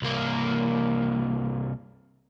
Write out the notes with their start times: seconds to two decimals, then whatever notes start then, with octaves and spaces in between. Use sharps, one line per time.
0.02 C2 A#3